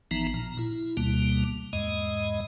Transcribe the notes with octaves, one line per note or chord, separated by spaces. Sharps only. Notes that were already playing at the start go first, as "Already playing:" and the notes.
A1 E3 F3 B3 D#4 A#5
A#2 A#5
E4
D2 B2 G3 A#3
E2 G#2 G#3 D#5